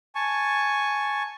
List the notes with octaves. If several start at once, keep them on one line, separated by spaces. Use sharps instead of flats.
G#5 A5 C#6